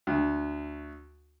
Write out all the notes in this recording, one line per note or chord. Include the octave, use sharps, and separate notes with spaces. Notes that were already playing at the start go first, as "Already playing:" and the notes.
D2